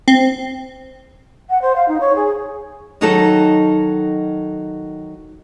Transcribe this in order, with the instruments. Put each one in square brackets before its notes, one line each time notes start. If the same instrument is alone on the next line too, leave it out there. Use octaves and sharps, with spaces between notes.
[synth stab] C4
[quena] F#5
C5
F5
D#4
C#5
G#4
[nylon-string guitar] D#3 F#3 D#4 F#4 A4 D#5